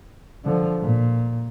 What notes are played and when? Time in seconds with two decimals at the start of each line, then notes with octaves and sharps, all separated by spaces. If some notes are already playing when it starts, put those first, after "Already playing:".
0.45 D3 F3
0.81 A#2